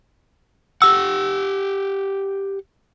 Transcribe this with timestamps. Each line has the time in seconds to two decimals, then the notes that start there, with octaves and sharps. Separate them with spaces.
0.82 G4 F#5 E6